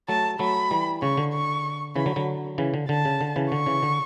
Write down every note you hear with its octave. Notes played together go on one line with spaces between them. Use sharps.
F#3 A3 A5
F#3 A3 B5
E3 G3
C#3 C#6
D3
C#6
C#3 E3 B5
D3 F#3
D3 F#3
C#3 E3
D3
D3 A5
C#3
D3
C#3 E3
D3 C#6
C#3 E3
D3